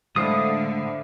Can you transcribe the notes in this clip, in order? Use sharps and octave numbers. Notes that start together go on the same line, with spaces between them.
A2 D3 G#3 C5 E5 F5 B5 D#6